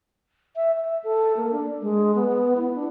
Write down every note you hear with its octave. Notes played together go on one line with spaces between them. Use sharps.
E5
E5
A4
A#3
D4
G#3
B3
E4
D4